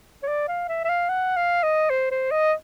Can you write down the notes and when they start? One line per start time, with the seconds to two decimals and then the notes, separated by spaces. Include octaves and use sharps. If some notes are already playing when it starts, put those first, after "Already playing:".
0.23 C#5
0.28 D5
0.48 F5
0.69 E5
0.85 E5
0.89 F5
1.09 F#5
1.36 F5
1.63 D#5
1.90 C5
2.11 C5
2.31 D#5